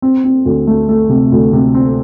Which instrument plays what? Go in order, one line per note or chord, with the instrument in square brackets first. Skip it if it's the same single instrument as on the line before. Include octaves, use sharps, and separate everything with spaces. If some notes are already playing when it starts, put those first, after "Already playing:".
[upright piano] C4
C4
D2
A3
A3
C3
D2
C3
C4